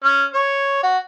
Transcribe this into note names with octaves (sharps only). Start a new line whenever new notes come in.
C#4
C#5
F#4